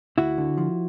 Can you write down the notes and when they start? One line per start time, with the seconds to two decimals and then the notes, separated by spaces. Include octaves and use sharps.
0.18 D2 E4 F#4
0.38 D3
0.58 F3